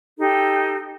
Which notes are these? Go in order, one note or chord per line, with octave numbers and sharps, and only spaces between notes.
D#4 G4 A4